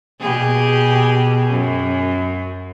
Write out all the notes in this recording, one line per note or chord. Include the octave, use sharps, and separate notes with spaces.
B2 G4 G#4
F#2